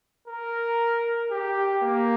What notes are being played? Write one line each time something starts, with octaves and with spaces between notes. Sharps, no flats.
A#4
G4
A#3